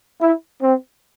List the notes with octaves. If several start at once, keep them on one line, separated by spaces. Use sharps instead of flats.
E4
C4